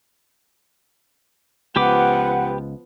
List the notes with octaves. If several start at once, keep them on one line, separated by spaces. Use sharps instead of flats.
C#2 F3 B3 G4 B4 F#5 D6